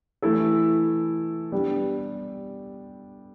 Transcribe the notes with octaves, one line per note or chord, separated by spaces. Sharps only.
E3 A3 E4 A4
G3 B3 D4 G4